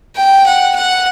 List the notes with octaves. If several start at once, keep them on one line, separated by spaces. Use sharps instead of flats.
G5
F#5
F#5